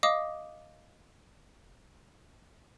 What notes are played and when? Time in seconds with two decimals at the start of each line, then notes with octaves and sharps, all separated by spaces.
0.03 D#5 F5 D6 D#6